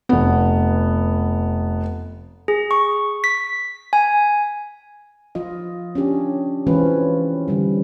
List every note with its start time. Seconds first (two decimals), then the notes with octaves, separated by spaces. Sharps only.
0.09 F1 B3
2.48 G#4
2.71 C#6
3.24 B6
3.93 G#5
5.35 F3 F4 D#5
5.95 C#4 D4 G4
6.67 E3 G#3 C4 C#4 F4 B4
7.48 D3 D#3 G3